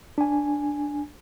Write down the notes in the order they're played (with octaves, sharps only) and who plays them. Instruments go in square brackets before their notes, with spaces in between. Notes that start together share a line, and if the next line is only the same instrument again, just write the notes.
[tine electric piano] D4 G#5